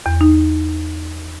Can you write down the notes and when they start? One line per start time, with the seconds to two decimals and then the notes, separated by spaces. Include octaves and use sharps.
0.06 E2
0.21 D#4